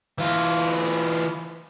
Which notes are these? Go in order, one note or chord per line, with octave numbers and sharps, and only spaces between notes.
E3 F4